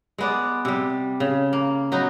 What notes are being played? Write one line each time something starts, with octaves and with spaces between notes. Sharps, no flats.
G#3 B3 D5
C3 G3
C#3
A#3
F#3 B3 D#4